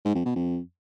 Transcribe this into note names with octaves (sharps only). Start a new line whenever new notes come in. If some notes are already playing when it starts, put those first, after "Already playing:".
G#2
F2
B2
F2